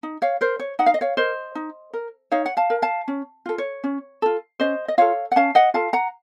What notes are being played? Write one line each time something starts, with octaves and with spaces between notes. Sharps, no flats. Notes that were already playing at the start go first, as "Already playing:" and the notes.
D#4
C#5 F5
A#4 C5
C#5
D#4 F#5
F5
D#5
C#5 F5
A#4 C5 D#5
D#4
A#4
D#4 C#5 F5
F#5
F5 A5
A#4
F5 A5
C#4
F4 A4
C#5
C#4
F4 A4
C#4 C5 D#5
D#5
F4 A4 C#5 F5
F#5
C#4 F5 A5
D#5 F#5
F4 A4 F5 A5
F#5 A#5